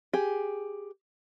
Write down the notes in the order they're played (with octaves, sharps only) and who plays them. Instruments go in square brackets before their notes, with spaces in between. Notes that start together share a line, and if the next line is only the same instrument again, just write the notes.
[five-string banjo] G4 G#4